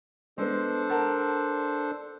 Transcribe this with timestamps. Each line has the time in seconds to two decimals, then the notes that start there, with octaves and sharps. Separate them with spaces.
0.38 G#3 B3 D4 A4 C5
0.90 A#4 F#5 A5